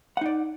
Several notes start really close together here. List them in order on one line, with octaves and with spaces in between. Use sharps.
F#5 D#4 D5